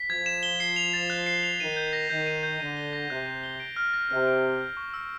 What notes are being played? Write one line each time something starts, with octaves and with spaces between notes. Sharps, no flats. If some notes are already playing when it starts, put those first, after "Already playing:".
Already playing: B6
F3 G#6
E7
G7
C7
F7
A6
F#6
C7
F7
D#3 D#7
G6
A#6
D#3 G6
D#7
G6
D3 D#7
G7
A#6
C3 F#6
D#7
G7
D7
F6
A#6
C3 F6
D7
F6
G6
C#6
E6